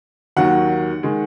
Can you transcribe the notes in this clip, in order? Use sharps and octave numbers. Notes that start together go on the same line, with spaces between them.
D#2 D#3 F#3 F#5
D#3 G#3